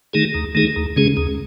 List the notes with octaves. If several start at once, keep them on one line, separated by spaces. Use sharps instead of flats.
D#3 A3 D#4 G#4
D#2
D#3 A3 D#4 G#4
D#2
C#3 G#3 C#4 G#4
D#2